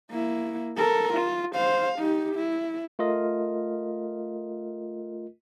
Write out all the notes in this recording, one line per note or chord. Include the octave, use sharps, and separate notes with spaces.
A#3 E4
A4 A#4
F4
C5 F5
D#4 G4
E4
A3 F4 A#4 D#5